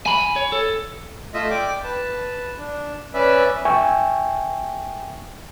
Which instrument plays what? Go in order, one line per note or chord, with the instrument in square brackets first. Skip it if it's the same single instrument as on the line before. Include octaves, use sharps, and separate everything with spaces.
[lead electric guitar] G#5 B5
C#5
A4
[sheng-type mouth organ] A3 F4 D#5 E5
D5 G5 D6
B4 A5
D4
C#4 B4 D5 E5
[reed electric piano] E5 G5 G#5 C#6